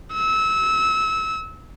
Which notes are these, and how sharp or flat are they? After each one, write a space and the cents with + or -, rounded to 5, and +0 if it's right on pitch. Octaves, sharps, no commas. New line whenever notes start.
E6 -25